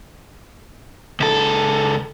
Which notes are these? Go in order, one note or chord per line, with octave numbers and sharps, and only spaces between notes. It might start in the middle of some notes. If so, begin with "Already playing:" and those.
C#2 A4